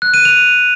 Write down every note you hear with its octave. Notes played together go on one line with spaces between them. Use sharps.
F#6
D#7
F7